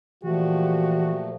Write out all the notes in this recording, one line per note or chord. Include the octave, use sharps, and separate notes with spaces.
A#2 E3 F3 A3 F#4 G4